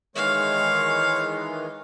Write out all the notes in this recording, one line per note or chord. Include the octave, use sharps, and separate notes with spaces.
D#3 E3 G#3 C#5 F5